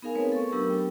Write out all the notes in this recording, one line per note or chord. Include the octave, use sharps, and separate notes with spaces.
B3 D#4 G#4 A#4 F5 G#5
A3 C4 B4 C#5
A4 C#6
F#3 B3 D4 G4 A#4 E6
G5